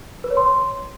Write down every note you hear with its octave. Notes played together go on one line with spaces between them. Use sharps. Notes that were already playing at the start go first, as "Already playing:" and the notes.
B4
C#5
C6